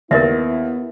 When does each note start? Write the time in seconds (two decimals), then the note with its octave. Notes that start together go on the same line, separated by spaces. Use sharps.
0.11 D#2 B3 E4 A#4 D#5 E5